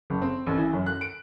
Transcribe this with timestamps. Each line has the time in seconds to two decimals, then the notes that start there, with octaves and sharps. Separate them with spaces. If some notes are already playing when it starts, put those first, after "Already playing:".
0.10 F#1
0.22 C4
0.47 A1
0.58 E3
0.73 F#2
0.86 F#6
1.01 D7